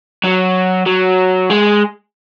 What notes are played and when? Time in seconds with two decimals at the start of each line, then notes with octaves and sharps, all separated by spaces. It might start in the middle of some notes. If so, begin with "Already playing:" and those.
0.24 F#3
0.86 F#3
1.50 G#3